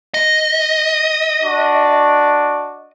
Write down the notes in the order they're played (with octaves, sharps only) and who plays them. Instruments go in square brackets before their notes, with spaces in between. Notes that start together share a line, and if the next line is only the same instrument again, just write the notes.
[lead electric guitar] D#5
[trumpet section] D4 F#4 D6